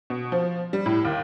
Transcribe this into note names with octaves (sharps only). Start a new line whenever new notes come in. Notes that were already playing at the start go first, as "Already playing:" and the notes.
B2
F3
G3
A2
D#2